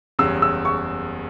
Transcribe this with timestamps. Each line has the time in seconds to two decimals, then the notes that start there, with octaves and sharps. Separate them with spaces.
0.19 F#1 E2 C#3 G3 E6
0.42 E6
0.65 C#6